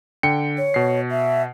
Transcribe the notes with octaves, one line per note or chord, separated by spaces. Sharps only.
D3 G5 C#7
C#5
B2 C7
E5